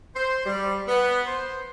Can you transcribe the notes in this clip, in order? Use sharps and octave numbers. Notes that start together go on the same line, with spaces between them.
C5
G3
B3
C5